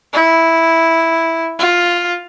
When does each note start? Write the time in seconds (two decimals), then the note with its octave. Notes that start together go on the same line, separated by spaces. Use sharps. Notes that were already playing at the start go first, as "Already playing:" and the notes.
0.13 E4
1.59 F4